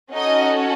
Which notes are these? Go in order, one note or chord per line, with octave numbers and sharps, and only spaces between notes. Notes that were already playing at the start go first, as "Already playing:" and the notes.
C#4 D#4 F#4 A4 D#5